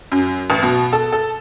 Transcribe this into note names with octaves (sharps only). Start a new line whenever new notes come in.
F#2
A1
B2
A4
A4